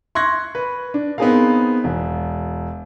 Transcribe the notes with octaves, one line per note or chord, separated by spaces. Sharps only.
C6 C#6 F#6 G#6 A#6
B4
D4
B3 C4 D#4 G#4 A#4 F5
E1